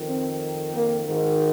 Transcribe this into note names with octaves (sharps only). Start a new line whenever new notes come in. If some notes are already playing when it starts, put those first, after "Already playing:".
Already playing: F2 D#3
C4
A#3
G#1 G#2 D#3